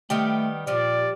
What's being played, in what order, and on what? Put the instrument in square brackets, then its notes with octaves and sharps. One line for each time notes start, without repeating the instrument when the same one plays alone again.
[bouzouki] D#3 G3 B3 [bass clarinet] A3 [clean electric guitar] G4
[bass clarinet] A#2 [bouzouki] F3 G3 [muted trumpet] D5